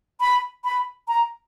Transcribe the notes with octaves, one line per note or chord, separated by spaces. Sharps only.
B5
B5
A#5